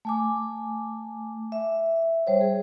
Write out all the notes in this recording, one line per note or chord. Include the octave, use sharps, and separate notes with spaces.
A3 G#5 D6
E5
G3 C5 C#5
G#4